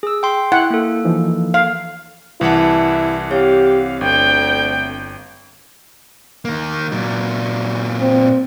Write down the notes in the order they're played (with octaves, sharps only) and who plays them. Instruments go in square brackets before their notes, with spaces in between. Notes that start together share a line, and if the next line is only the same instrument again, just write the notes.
[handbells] G#4 E6
G5 C6
[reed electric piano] E4 [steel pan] F#5
[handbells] A#3 A4
[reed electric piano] E3 F3 D#4
[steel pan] F5
[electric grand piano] C2 E3 F#5 [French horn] E4 [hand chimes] B4 A5
[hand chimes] C4 C#5 [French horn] G4 [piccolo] F5
[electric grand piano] G1 [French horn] D2 [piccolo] G5
[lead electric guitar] D#3 A#3
A#2 F#3
[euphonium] C4